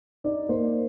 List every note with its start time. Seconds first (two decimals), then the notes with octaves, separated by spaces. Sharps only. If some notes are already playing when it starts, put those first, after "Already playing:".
0.24 D#4 D5
0.49 A#3 C5